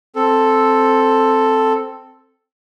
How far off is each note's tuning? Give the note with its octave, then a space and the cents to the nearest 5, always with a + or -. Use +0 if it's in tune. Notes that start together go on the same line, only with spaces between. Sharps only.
C4 +0 A4 +0